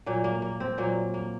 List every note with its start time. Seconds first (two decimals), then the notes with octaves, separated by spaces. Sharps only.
0.06 A#2 F#3 A#3
0.24 A#3
0.42 A#3
0.60 C4
0.78 A#2 F#3 A#3
1.14 A#3